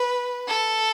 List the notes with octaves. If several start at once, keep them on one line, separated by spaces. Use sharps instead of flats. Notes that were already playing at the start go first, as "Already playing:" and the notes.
Already playing: B4
A4